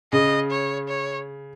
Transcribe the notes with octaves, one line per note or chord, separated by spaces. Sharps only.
C#3 D#5
C#5
C#5